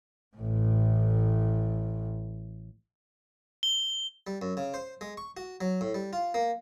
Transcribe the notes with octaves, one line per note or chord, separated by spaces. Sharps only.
A1 A2
G7
G3
F#2
C#3
C5
G#3
C#6
F#4
F#3
A2
G3
F4
A#3